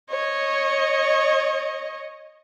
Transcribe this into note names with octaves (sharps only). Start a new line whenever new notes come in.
C#5 D#5